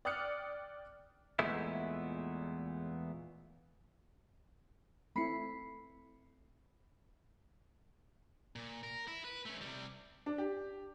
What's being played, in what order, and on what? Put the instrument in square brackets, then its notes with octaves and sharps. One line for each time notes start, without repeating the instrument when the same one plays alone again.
[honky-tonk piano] D5 G5 D#6 F6 F#6 C#7
[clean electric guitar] E2 A#2 G#3 A3 B3 E4
[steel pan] A3 C4 E4 [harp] B5 C7 C#7
[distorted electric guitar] A#2
A#4
E4
B4
A3 C#4
C3 G3
[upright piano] D4
G4